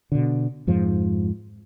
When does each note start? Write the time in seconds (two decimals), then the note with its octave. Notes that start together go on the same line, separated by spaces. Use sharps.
0.12 B2 D3
0.67 F2 G#2 F3